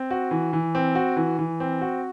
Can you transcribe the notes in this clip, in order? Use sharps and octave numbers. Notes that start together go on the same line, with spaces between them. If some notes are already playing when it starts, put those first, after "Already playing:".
Already playing: C4
F#4
E3
E3
C4
F#4
E3
E3
C4
F#4